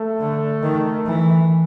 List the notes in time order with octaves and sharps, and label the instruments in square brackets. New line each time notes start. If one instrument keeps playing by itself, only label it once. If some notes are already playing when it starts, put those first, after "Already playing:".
Already playing: [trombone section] A3
[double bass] D3
D#3
E3